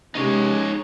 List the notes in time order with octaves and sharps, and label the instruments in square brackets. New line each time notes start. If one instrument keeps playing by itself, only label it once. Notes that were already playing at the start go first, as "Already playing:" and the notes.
[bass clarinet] C3 [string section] G#3 [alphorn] C#4 [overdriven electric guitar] D#4 C#5